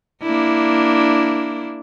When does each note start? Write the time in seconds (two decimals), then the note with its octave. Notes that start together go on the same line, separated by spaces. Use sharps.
0.22 A#3 D4 E4